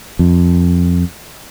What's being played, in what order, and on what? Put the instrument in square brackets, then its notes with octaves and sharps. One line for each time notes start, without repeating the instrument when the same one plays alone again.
[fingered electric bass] F2